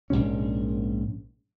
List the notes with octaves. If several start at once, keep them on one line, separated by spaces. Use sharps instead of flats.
A#1 G#2 C3 C#4